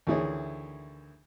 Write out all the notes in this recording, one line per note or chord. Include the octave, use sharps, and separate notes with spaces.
D2 D#3 E3 G#4 C#5